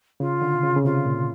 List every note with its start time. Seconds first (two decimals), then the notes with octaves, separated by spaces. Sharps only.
0.20 C#3 F4
0.42 D3
0.54 C3
0.63 C#3
0.76 C#3
0.84 C3 F4
1.05 A#2